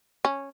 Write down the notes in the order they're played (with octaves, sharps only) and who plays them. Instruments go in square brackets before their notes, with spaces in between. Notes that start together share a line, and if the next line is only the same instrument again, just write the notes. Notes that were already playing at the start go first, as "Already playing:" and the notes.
[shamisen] C#4